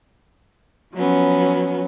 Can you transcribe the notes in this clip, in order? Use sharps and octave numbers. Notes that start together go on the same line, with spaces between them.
F3 F#3 B3 C#4